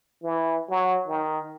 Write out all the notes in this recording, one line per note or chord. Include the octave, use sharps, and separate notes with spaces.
E3
F#3
D#3